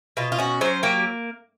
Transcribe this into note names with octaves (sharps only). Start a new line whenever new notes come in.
B2 F4
F4
C#4 F#4
F#3 C5
A#3 G4